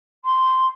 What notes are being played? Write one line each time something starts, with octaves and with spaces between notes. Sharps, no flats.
C6